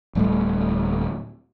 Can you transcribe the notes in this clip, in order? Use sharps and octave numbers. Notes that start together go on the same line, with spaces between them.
D1 G3 A3